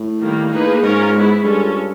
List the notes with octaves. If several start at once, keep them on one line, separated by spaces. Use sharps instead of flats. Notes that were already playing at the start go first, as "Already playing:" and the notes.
Already playing: A2
D#3 G3 A#3
A#3 D#4 G#4 B4
G#2 C#4 F4 A#4 C#5
G#3 B3 E4
G2 C#4 F4 A4